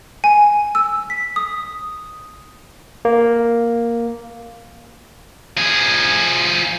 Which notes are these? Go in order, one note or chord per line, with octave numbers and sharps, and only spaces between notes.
G#5
E6
B6
D#6
A#3
F3 G#4